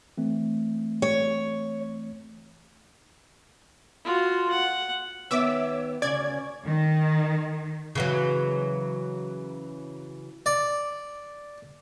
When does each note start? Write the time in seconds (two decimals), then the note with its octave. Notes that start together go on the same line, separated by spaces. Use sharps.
0.18 E3 A3 C4
1.02 C#5
4.05 F4 F#4
4.50 F#5
5.31 D#3 B3 C#5 E5 D6 E6
6.02 D2 C#3 C#4 D5 G#6
6.66 D#3
7.95 C#3 E3 F#3
10.46 D5